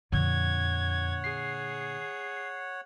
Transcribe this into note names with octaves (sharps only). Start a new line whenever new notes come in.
F2 A#2 D3 C#5 F#5 G#6
G#4 C7